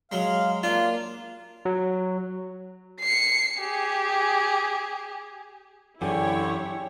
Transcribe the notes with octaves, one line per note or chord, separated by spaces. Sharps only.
F#3 G#3 F5
A#3 D4 F4
F#3
C7 C#7
G4 G#4
F#2 D3 E3 E4 G4 G#4 C#5